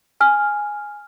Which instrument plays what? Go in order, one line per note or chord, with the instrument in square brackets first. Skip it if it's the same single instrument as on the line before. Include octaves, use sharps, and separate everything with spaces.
[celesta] G#5 F6